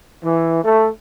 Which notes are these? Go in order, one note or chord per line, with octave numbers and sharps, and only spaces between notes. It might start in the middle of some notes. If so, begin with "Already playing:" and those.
E3
A3